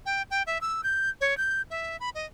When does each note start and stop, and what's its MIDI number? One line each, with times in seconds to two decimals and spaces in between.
0.06 0.22 79
0.31 0.43 79
0.47 0.60 76
0.61 0.81 88
0.83 1.10 91
1.21 1.36 73
1.37 1.62 91
1.70 1.97 76
2.00 2.09 83
2.15 2.26 75